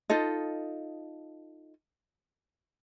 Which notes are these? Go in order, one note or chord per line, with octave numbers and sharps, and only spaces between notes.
D#4 F4 A4 D#5